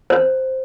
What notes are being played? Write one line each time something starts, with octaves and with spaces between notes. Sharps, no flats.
C5